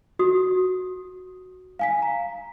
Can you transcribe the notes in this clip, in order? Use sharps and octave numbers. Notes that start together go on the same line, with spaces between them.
F#4 D#6
F5 G#5 B6
A#5